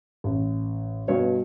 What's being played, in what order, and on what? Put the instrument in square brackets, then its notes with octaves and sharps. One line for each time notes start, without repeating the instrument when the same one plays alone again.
[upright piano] A1
[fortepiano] G2 C#5 [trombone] B2